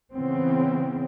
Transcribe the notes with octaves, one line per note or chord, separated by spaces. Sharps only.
C#3 E3 B3 C4